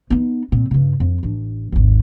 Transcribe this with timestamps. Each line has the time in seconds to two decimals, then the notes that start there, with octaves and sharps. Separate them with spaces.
0.10 B3 D#4
0.52 A#2 C4
0.71 G2 C#3
1.00 F2
1.23 A1 D4
1.72 G#1 D#2